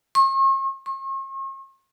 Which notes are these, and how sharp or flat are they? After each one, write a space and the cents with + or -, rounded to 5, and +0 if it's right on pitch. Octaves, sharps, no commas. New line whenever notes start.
C#6 -45
C#6 -45